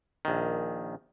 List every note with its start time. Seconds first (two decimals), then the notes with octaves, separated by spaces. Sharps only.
0.25 A#1 D#3